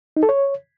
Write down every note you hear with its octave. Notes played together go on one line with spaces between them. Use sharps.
D#4
A4
C#5